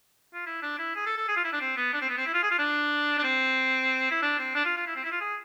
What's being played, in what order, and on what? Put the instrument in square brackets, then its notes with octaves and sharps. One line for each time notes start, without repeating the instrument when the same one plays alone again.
[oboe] F4
E4
D4
E4
G#4
A4
A4
G#4
F4
E4
D4
C4
B3
D4
C4
B3
C4
E4
F4
G#4
F4
D4
D4
C4
E4
D4
C4
D4
F4
F4
E4
C4
E4
F4
G#4